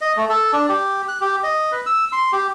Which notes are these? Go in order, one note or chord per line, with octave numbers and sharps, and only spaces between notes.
D#5
A3
A4
D4
G4
F#6
G4
D#5
B4
E6
C6
G4